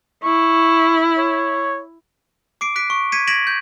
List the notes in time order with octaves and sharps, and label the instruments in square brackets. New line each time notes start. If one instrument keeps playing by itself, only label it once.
[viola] E4 [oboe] C#6
[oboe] C#5
[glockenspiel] D6 C7 D7
F#6 B6 D7
C#6
G#6 B6 C#7 D#7
G#6 A#6 B6 D7 E7 F#7
G6